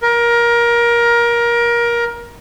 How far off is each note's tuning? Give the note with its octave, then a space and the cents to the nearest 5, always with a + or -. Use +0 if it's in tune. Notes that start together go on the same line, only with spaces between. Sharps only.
A#4 +20